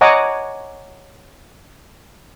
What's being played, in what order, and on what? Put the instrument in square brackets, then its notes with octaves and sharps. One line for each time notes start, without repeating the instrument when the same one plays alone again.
[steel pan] C#5 D#5 F#5 G#5 A#5 D6